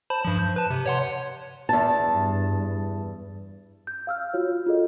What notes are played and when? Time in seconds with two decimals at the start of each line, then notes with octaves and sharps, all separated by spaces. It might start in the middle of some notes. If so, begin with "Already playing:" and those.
0.10 C5 A5 B5
0.25 G2 F3
0.39 G6
0.56 B4 A5
0.70 C3
0.86 C#5 F#5 C6
1.69 E2 A5
2.11 G2
3.87 G6
4.07 F5 E6 F6
4.34 F4 F#4 C#5
4.66 F4 F#4 G#4 A4 D#5